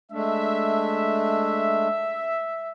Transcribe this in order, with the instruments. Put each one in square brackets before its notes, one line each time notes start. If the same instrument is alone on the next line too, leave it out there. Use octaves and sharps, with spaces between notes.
[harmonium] G#3 A3 D4 [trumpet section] E5